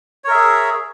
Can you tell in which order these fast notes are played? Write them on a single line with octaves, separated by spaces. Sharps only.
C#5 A#4 E5 G#4